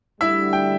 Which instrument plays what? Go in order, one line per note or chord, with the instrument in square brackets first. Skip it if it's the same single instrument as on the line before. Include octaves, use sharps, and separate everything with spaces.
[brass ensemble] D2 D3 G3 [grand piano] E4 E5
[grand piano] G5